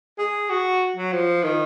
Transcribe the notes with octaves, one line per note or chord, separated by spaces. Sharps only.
G#4
F#4
F#3
F3
D#3